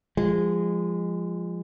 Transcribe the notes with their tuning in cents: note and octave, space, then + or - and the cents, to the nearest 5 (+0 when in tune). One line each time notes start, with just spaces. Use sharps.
F3 +0 G#3 -20